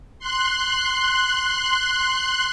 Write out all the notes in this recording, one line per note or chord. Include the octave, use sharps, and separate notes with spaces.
C6 F#6